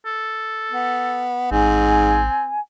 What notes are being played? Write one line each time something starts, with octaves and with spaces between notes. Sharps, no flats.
A4
B3
A1 G#2 C4 G#5